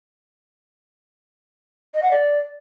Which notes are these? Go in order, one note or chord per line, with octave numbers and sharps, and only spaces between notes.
D#5
F#5
D5